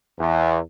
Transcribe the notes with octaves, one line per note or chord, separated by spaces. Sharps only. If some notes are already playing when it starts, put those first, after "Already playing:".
E2